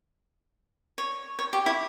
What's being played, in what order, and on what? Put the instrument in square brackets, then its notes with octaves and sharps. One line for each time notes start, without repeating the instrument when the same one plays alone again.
[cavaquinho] C#5
C#5
G4
E4